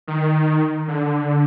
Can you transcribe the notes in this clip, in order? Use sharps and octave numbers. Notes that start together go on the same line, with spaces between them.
D#3
D3